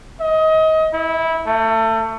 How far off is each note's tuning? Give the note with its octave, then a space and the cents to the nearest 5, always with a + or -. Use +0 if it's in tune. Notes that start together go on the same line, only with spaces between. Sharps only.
D#5 +25
E4 -20
A3 +30